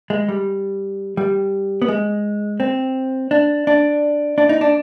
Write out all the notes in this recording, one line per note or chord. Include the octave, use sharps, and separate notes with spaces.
G#3
G3
G3
B3
G#3
C4
D4
D4
D4
D#4
D4